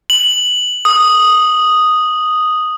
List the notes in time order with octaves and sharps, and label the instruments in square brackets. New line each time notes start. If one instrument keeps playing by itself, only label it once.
[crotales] F#7
D#6